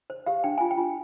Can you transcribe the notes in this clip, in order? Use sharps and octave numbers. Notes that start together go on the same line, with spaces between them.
C5
G4 F5
D4 G5
F4 G#5
G5
F4